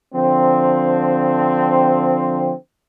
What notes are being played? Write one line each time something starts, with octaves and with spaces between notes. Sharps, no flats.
D3 F3 C4